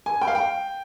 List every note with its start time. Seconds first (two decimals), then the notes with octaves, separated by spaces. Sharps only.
0.06 G#5
0.21 G5
0.28 F5
0.35 G5